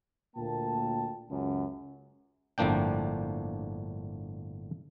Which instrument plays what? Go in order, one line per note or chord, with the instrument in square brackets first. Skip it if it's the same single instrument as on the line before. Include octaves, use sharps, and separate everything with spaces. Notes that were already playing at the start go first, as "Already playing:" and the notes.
[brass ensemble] D2 A#2 A#3 G5 A5
C#2 F#2
[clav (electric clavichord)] G1 A2 F3 A#3 D4 G5